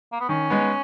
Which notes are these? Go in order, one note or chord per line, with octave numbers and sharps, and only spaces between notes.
A#3
B3
D#3 C#4
G#3 B3 D#4